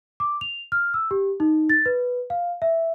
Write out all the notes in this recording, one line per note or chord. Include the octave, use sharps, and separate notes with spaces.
D6
F7
F6
E6
G4
D#4
A6
B4
F5
E5